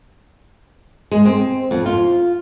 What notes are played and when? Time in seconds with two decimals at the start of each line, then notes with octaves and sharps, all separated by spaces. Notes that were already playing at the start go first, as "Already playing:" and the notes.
1.12 G#3
1.25 C4
1.71 F2
1.86 F4